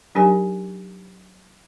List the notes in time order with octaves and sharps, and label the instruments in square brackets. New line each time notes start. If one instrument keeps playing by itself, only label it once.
[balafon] F#3 D4 D#4 G4 A#4 G#5